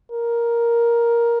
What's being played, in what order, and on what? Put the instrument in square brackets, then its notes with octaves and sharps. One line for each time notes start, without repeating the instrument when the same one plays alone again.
[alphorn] A#4